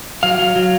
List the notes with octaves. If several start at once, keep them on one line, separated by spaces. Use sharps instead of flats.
F#3 F5
F#3
F#3